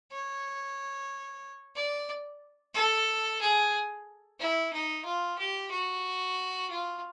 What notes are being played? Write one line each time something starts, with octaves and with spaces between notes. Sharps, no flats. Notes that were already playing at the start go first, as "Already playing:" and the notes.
C#5
D5
A4
G#4
E4
D#4
F4
G4
F#4
F4